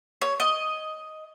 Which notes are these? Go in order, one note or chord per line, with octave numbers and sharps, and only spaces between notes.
C#5
D#5